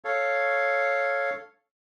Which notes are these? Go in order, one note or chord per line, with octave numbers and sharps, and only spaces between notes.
A4 C#5 F5